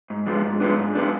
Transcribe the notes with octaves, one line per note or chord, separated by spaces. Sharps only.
G#2
F3 G#3 B3 D4
G#2
F3 G#3 B3 D4
G#2
F3 G#3 B3 D4